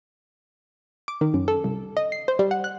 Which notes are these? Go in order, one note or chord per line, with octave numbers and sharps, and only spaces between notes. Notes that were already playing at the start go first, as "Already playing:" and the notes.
D6
D#3
F#2
A4
C2
D#5
C7
C5
G3
F#5
F#6